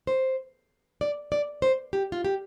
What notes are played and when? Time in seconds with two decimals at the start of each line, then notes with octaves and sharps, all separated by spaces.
0.07 C5
1.01 D5
1.32 D5
1.62 C5
1.93 G4
2.12 F4
2.25 G4